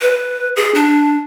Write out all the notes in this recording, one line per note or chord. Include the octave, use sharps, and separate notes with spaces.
B4
G#4
D4